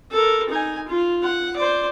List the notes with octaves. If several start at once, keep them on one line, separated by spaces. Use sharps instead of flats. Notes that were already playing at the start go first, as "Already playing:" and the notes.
A4 A#4
D#4 G#5
F4
F#5
C5 D5